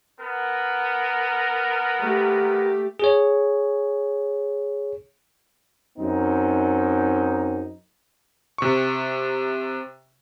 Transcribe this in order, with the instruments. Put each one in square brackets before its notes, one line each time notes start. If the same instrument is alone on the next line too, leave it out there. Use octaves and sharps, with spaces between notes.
[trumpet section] B3 A#4
[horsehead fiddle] A3 G4
[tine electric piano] G#4 C#5
[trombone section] F#2 C4 D#4
[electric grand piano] C3 C#6